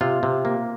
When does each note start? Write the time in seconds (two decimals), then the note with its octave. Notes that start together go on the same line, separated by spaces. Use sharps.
0.01 C3 F4
0.23 C3
0.45 A#3